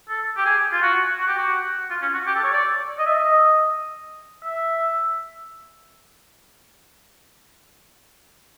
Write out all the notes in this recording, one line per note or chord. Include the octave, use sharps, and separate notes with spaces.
A4
G4
G#4
F4
F#4
F#4
G4
F#4
F4
C#4
F#4
G4
A4
C#5
D5
D#5
E5
D#5
E5